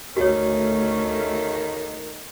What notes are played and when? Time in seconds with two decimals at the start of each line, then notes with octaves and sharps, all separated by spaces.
0.17 D2 D#3 A3 C#4 F#4 C#5